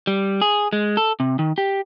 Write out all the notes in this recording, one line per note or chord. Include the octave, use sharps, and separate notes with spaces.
G3
G#4
G#3
A4
C3
D#3
G4